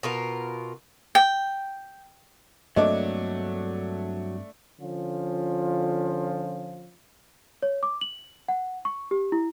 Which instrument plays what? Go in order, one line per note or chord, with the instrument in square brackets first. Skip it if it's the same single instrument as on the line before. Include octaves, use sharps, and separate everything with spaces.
[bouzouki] B2 F4 A#4
[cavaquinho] G5
[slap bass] G2 A#3 C4 [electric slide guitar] F#3 [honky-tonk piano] A3 D4 D6 [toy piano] D#5
[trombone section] D3 F3 C#4 F4
[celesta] C#5
D6
F#7
F#5
C#6
G4
E4